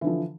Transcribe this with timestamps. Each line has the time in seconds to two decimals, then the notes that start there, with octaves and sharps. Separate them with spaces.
0.01 E3
0.04 D3
0.07 F3